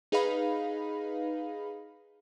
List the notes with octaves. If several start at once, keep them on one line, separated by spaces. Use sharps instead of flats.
D#4 G#4 B4 D#5 F5 B5